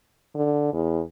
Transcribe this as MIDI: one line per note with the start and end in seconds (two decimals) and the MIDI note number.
0.35 0.72 50
0.73 1.02 40